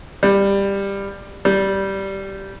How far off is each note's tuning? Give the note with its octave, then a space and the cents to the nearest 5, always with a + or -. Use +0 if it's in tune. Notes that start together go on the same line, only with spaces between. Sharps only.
G3 +15
G3 -10